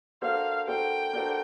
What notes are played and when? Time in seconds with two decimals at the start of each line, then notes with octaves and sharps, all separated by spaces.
0.22 A#3 D4 F#4 A4 C5 F5
0.67 A#3 D4 F#4 A4 C5 G5
1.13 A#3 D4 F#4 A4 C5